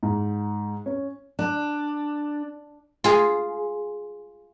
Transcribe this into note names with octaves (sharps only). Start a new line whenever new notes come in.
G#2
C#4
D4
F4 G#4